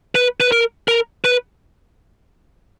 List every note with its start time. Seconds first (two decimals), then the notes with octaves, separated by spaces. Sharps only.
0.15 B4
0.40 B4
0.52 A#4
0.88 A#4
1.25 B4